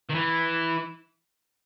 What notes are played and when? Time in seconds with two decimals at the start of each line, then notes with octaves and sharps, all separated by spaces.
0.09 D#3
0.14 E3